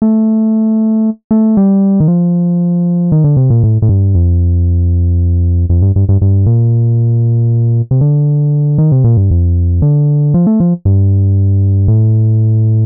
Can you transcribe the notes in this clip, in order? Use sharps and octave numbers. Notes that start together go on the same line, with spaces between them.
A3
A3
G3
D#3
F3
D#3
D3
C3
A#2
A2
A2
G2
F2
F2
G2
G2
G2
G2
A#2
C3
D3
D#3
C3
A#2
G2
F2
D3
F3
A3
F3
G2
A2